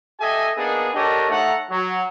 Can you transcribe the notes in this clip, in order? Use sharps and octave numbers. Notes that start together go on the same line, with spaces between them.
G4 A4 D#5 E5 G#5
A#3 B3 D4 D#4 G#4
D4 G4 A4 A#4 C#5 D#5
A3 D#4 A4 C#5 F#5 A#5
F#3